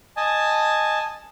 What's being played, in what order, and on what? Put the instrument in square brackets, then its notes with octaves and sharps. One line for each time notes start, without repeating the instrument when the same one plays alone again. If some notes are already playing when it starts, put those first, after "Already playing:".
[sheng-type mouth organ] D#5 G#5 A5